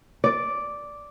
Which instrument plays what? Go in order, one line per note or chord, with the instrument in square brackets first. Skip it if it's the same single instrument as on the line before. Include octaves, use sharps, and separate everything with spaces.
[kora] D5